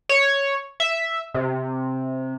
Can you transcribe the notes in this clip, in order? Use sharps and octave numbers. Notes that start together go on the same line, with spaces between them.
C#5
E5
C3